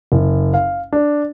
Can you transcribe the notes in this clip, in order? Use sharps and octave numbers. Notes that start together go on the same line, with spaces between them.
F#1
F5
D4